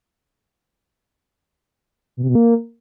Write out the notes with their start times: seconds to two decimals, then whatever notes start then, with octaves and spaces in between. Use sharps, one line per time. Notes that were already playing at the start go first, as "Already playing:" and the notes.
2.17 B2
2.23 C3
2.29 B2
2.35 A#3